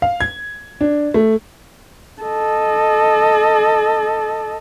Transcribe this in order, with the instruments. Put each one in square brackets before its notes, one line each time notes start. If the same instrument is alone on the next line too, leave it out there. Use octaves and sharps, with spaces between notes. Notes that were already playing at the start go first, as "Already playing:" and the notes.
[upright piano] F5
G#6
D4
A3
[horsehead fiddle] A4 D#5